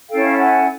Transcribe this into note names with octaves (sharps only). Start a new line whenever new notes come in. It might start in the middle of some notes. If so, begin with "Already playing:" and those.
C#4 E4 A4 F5 G5
F#5 G#5